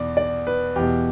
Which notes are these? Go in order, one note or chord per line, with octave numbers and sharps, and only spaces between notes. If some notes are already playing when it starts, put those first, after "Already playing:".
Already playing: E2 B2 D5
D5
B4
E2 G4
B2